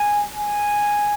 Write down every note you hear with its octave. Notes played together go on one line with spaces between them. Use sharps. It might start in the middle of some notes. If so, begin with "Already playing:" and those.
Already playing: G#5
G#5